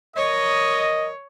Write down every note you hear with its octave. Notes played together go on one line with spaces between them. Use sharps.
A#4 C#5 D#5